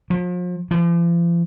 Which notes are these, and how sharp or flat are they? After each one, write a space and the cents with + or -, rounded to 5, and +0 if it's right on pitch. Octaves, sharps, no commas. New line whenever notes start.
F3 +40
F3 -40